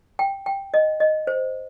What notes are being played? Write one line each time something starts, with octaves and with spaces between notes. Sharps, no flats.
G5
G5
D#5
D#5
C5